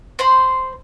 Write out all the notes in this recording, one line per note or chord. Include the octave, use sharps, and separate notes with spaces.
C5 B5 C6